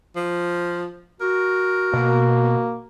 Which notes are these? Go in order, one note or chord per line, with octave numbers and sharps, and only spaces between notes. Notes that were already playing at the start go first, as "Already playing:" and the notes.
F3
F#4 A#4
B2 A#3